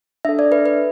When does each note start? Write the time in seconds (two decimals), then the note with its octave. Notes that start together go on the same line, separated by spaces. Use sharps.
0.25 D4 A4 E5
0.39 D5
0.52 B4
0.66 B4